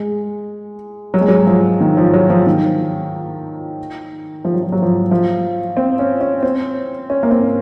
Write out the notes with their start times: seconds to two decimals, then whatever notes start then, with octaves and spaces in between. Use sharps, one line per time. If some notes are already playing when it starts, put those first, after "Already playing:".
Already playing: G#3
1.14 F#3
1.21 G#3
1.28 F#3
1.47 F3
1.81 D#3
1.97 F3
2.13 F#3
2.30 F3
2.47 D#3
4.45 F3
4.54 F#3
4.63 F3
4.72 F#3
4.82 F3
5.11 F3
5.77 C4
5.99 C#4
6.21 C#4
6.43 C4
7.10 C#4
7.23 A#3
7.31 C4